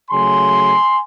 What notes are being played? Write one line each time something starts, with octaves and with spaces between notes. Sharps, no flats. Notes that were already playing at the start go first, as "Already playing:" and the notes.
C#3 F#3 A3 G#5 C6